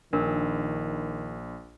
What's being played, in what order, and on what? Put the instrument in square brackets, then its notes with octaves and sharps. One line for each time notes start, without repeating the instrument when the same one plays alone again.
[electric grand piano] A#1 [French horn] D#3 [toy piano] D4 A#4